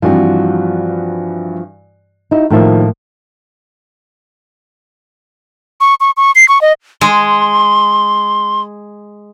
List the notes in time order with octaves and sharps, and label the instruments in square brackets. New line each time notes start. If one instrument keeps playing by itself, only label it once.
[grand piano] G2 E3 F#4 [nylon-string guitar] F3 G3 C4
[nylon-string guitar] D#4 E4 F#4
[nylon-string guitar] A2 A#3 E5 [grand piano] D#3 F3
[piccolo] C#6
C#6
C#6
C7
C#6
D#5
[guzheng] G#3 [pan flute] C6